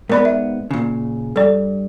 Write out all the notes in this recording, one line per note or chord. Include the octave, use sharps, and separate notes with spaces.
G#2 B3 A#4 D5 B5
E5
A#2 C#3
G2 A4 D5